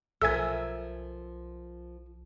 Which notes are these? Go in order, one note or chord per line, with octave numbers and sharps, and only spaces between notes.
B1 F3 A4 A#4 E5 G#5 E6 G#6